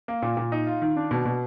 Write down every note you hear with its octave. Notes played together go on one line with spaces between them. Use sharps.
A#3
A#2
A#2
D#4
F4
D#3
D4
B2
B2